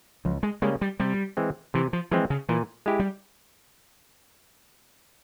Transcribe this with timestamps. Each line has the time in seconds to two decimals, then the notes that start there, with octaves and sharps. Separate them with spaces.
0.25 C#2 F3
0.43 G#3
0.62 C#3 G3 G#3 A#3 C#4
0.81 G3
1.00 C3 G3
1.37 E3 G#3 C4
1.74 C3 E3
1.93 F3
2.11 E3 F3 G#3 C4
2.30 C#3
2.49 A#2 E3
2.86 G#3 E4 G4
3.00 G3